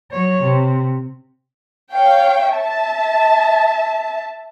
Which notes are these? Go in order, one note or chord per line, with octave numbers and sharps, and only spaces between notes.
F#3 C#5
C3
C#5 F5 G5
E5 A5